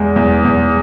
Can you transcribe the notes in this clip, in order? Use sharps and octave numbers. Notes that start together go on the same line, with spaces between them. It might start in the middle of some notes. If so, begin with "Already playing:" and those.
Already playing: E2 G#3
E2
E2